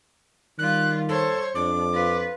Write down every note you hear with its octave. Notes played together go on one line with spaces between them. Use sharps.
D#3 G3 F4 F#6
A4 C5 C#5
F2 D4 D6
F4 B4